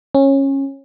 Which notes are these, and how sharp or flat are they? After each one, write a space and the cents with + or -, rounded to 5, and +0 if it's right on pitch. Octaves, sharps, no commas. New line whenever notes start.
C#4 -20